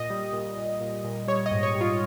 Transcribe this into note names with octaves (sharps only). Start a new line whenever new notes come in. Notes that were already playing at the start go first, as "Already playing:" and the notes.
Already playing: A#2 D#5
G3
A#2
A#2
A#2
A#2
G3 C#5
D#5
G#2
C#5
G3
F4